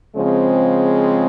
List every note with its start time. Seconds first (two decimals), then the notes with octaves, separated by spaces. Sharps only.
0.16 C#3 F3 G#3 C4